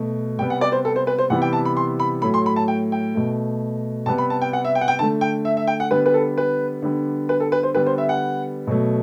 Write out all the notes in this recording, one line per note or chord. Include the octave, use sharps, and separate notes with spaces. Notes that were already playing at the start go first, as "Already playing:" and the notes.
Already playing: B2 A3
C3 G3 B3 G5
F#5
D5
C5
A4
C5
B4
C5
C3 E3 G3 B3 F#5
G5
A5
B5
C6
B5
A2 F#3 A3 B5
C6
B5
A5
G5
G5
B2 A3
C3 G3 B3 A5
B5
A5
G5
F#5
E5
G5
F#5
G5
D3 A3 A5
G5
E5
E5
G5
F#5
D3 G3 B3 B4
B4
A4
B4
D3 G3 B3
B4
A4
B4
C5
D3 G3 B3 B4
C5
E5
F#5
B2 F#3 A3